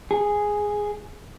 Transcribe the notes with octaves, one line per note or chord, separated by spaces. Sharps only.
G#4